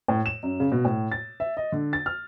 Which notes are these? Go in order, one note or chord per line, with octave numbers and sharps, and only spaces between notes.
A2
E7
F#2
C#3
B2
A2
A6
E5
D#5
D3
A6
F6